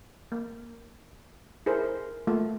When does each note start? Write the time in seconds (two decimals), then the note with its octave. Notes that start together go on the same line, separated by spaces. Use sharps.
0.32 A#3
1.66 E4 G#4 A#4 C5
2.27 A3 A#3 F4